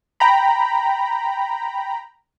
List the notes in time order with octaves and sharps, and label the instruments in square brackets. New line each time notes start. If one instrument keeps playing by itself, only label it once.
[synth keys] G5 A#5 B5